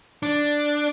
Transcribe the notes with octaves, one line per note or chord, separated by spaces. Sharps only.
D4